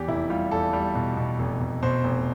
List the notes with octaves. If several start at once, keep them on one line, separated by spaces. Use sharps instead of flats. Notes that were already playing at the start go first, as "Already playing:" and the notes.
Already playing: E2 G4
F1 E4
G3 F4
E2 A4
G3
B2
B2
F1
F1
B2 C5
F1